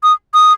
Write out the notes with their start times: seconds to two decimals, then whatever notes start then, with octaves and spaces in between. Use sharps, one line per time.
0.03 D#6
0.34 D#6